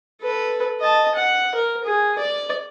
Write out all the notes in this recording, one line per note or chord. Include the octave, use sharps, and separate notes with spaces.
A4 B4
D#5 A5
F#5
A#4
G#4
D5